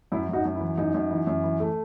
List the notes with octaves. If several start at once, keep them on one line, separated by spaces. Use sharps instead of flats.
F#2 E4
F#2 D#4 F#4
F#2
E4
E3
F#2 D#4
F#2
E3
F#2
E3
A3